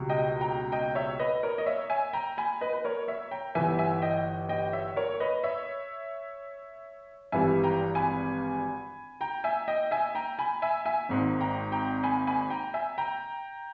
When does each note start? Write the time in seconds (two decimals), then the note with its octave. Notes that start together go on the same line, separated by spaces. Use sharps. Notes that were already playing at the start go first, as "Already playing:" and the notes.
Already playing: C#2 B2 G3
0.09 D#5 G5
0.41 G5 A#5
0.72 D#5 G5
0.95 C#5 E5
1.19 B4 D#5
1.43 A#4 C#5
1.58 D#5
1.66 C#5 E5
1.90 E5 G#5
2.13 G5 A#5
2.37 G#5 B5
2.61 B4 D#5
2.73 B4
2.85 A#4 C#5
3.08 C#5 E5
3.31 G5 A#5
3.55 G1 G2 E3 E5 G#5
3.79 E5 G#5
4.02 D#5 G5
4.49 D#5 G5
4.73 C#5 E5
4.96 A#4 C#5
5.20 B4 D#5
5.44 C#5 E5
7.32 G#1 G2 E3 G3 E5 G#5
7.63 G5 A#5
7.95 G#5 B5
9.21 G5 A#5
9.44 E5 G#5
9.68 D#5 G5
9.91 E5 G#5
10.15 G5 A#5
10.39 G#5 B5
10.62 E5 G#5
10.86 E5 G#5
11.09 G#1 G#2 D#3
11.41 G5 A#5
11.72 G5 A#5
12.03 G#5 B5
12.27 G#5 B5
12.50 G5 A#5
12.74 E5 G#5
12.98 G5 A#5